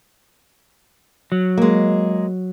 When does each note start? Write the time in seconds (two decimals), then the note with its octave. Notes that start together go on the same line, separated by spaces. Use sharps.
1.32 F#3
1.57 G#3 A#3